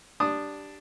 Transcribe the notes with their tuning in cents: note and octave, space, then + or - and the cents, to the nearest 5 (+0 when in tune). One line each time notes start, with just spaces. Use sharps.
G3 +0 D4 +0 D#6 -15